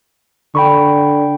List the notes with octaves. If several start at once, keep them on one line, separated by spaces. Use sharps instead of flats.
D3 G5 B5 C#6